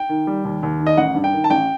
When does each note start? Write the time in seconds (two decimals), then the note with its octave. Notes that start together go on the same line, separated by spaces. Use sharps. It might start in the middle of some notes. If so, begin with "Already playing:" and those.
Already playing: G5
0.09 D#3
0.27 G3
0.45 D#2
0.63 D#2
0.80 D#3
0.87 D#5
0.97 A1 F#5
1.15 G2
1.24 G5
1.33 D#3
1.44 A5
1.50 A1 G5